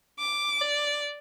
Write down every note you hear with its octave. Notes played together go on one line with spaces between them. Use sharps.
D6
D5